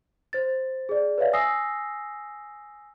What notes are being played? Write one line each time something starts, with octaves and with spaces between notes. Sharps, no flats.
C5 A6
G#4 D5
B4 C#5 D5 E5 F5
G#5 D#6 E6 A#6 C7